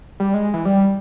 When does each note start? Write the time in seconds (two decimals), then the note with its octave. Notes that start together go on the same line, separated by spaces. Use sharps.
0.20 G3
0.34 G#3
0.54 E3
0.65 G3